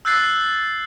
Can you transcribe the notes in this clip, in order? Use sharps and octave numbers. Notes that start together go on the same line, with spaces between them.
E6 F#6 G6 A6 C7